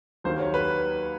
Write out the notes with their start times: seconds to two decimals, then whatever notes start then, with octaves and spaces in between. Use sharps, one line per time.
0.24 D#2 D#3 F#3 A#3 C5
0.39 C#5
0.54 B4